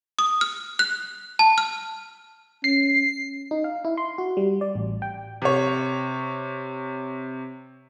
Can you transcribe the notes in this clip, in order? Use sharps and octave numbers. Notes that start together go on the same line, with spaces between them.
D#6
F6
F#6
A5
F6
C#4 C7
D#4
F5
E4
C6
F#4
G3
D5
A1
G5
C3 C#5